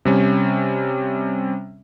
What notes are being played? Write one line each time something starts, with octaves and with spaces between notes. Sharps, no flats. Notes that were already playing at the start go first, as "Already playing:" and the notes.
C3 G3 C#4